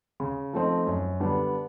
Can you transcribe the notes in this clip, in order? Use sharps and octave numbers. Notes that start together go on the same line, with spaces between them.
C#3
F3 A3 C4 D#4
F#2
D3 G3 B3 D4